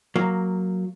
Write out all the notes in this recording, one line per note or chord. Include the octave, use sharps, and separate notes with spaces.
F#3 A#3